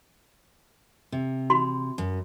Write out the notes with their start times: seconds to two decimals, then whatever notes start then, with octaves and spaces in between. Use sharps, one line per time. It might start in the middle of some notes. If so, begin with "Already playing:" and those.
1.12 C3
1.50 F#4 B5 C6
1.98 F#2